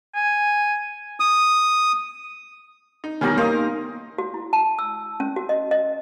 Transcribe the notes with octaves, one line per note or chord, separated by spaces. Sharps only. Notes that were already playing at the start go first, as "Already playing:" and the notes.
G#5
D#6
D#4
B2 D#3 G3 C#4 G4 A#5
A#3 D#4 A#4 C5 F5 D#6
F#4
E4
A5
E6
C#4
F#4
D#5
D#5